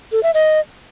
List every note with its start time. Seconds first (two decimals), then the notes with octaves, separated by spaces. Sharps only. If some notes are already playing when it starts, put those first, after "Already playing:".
0.12 A4
0.23 E5
0.34 D#5